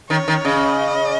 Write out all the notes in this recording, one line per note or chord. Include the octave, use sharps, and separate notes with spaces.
D#3 C#5
D#3
C#3 D#5